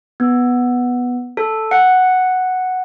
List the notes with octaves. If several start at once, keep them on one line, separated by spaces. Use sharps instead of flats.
B3
A4
F#5